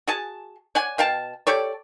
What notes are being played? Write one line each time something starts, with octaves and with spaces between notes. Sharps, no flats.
F#4 G#4 A5
C#5 D5 F#5 G#5
B2 F5 G5 A5
G4 A4 C#5 D5